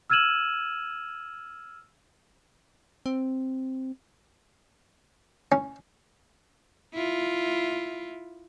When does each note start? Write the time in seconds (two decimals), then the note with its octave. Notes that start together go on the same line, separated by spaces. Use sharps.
0.10 E6 F6 G#6 D#7 E7 F#7
3.06 C4
5.52 C#4
6.94 E4 F4